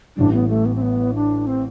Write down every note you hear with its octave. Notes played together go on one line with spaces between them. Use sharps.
A1 A2 G3 D4
B3
A3
B3
C4
B3
D4
C4